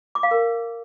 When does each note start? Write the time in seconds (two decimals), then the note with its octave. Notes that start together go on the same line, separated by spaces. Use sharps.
0.15 D6
0.23 F5
0.31 A#4